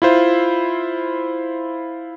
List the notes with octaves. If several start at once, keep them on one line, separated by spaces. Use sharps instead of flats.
E4 F4 C5